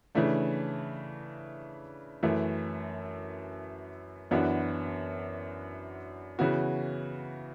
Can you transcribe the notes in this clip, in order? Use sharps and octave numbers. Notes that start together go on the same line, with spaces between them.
C#3 E3 A3 D4
F#2 E3 A3
F#2 E3 B3 D4 F#4
C#3 E3 B3 F#4